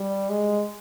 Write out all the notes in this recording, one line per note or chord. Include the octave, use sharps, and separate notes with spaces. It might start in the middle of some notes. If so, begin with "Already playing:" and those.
Already playing: G3
G#3